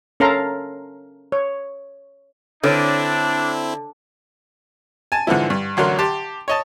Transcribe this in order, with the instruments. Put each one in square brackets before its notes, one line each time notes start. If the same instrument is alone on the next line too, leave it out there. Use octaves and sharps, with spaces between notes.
[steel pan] C#4 A4 A#4 F5 A#5 C6
C#5
[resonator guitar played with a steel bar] D3 [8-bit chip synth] C4 E4 [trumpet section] D4 [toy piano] A4 B4 C#5
[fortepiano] G#5 A5
G#2 D3 E3 F3 E4
G2
A1 D3 F#3 A#4 C6
G4 A5 C6
C#5 D#5 A5